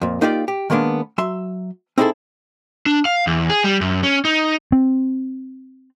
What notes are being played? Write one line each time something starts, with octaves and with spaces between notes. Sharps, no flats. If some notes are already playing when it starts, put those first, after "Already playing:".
F2 A#2
A#3 D#4 F4 G4 C5 D5
G4
D#3 G#3 A#3 B3 D4
F#3 E5 C6
C4 D#4 E4 F#4 G#4 A4
D4
F5
E2
G#4
G3
F#2
C#4
D#4
C4